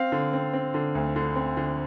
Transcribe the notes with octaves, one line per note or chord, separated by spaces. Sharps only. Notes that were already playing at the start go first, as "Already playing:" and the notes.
Already playing: C4 F5
D3
C4
C4
D3
D2
D3
C4
D3